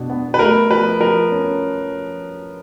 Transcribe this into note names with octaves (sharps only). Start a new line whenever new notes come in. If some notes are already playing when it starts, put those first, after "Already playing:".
Already playing: B2 D4
B3
B4
A3 A#4
F3 B4
F3 A#4
C#4